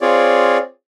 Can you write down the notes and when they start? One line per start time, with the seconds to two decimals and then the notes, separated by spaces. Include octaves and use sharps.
0.01 C4 F4 G#4 C#5 D5